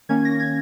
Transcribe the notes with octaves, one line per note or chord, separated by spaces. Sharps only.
D#3 A#3 C#4 G#6
A#6
G#6